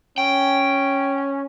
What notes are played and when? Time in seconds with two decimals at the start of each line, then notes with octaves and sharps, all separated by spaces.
0.18 C#4 G5